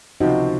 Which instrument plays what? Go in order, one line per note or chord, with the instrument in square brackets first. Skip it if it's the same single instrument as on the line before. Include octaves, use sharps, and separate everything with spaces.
[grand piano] C#2 C3 F3 C4 [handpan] D#4 F#4